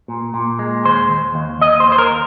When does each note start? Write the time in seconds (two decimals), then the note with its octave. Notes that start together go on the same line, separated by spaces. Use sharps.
0.08 A#2
0.34 A#2
0.59 G#3
0.85 D#2 C5
1.10 D#2
1.35 D#2
1.61 D#2 D#5
1.80 C5
1.87 D#2
1.92 C5
1.98 A#4